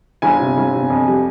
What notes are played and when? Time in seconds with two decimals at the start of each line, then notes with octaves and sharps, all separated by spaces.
0.22 G1 G#5
0.39 C3
0.57 G1
0.73 C3
0.90 F2
1.06 G3